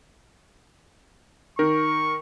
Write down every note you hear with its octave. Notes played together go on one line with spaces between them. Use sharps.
D#3 A#4 C#6